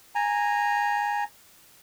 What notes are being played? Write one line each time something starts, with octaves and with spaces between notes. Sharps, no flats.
G#5 A#5